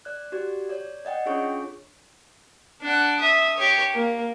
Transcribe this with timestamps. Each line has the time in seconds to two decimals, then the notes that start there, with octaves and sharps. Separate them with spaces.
0.05 D5 F#6
0.32 F#4 G4 D5
0.69 C#5 D5
1.05 D5 D#5 F#5 G5
1.26 C#4 D4 F4 G#4 C#5 C#6
2.82 D4 F#5
3.20 E5 D#6
3.57 G4 C#5
3.94 A#3